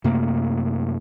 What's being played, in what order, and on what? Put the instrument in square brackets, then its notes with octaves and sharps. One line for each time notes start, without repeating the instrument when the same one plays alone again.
[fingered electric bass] F#2 C3 A3 A#3